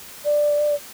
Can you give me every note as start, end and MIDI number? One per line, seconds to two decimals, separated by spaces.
0.25 0.75 74